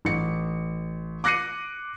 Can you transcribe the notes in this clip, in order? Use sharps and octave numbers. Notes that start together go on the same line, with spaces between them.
A1 C#7
D6 F#6 A#6 C7 C#7 D#7